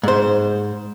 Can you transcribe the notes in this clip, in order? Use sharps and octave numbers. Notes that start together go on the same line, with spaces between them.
G#2 C5